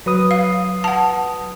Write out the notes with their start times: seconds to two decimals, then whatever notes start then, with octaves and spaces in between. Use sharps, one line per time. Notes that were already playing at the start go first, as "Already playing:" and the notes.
0.06 F#3 B4 D#6
0.31 F5
0.84 F#5 A5